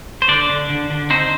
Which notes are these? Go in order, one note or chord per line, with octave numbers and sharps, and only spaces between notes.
C5
D3 D4 D5
D3
D3
D3
C4 D#4 C5